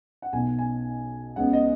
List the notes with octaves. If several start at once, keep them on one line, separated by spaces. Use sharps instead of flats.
F#5
B1 B2 B3 G#5
G#5
C#2 C#3 G#3 B3 F#5
D#5